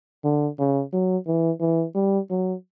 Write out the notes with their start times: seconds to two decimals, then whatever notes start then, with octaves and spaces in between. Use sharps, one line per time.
0.24 D3
0.59 C#3
0.93 F#3
1.27 E3
1.61 E3
1.95 G3
2.30 F#3